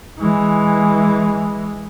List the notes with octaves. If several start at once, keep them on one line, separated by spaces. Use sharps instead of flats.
E3 G#3